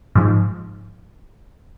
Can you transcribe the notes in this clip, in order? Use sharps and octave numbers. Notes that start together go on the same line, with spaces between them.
G#2 F3